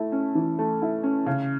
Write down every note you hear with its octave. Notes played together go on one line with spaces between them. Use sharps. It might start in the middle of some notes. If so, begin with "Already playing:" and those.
Already playing: A3 E4
C#4
E3
A3
E4
C#4
C#3